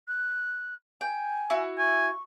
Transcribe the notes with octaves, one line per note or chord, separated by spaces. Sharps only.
F#6
G5 G#5
E4 F#4
G#5 C#6